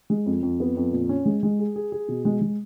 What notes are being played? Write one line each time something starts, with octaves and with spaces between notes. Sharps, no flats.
G#3
F2
F2
B3
F2
A#2
C#4
G#3
G#3
G#4
G#4
G#4
B2
G#3
G#3